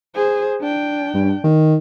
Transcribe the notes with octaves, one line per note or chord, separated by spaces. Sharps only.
G#4 C5
D4 G5
G2
D#3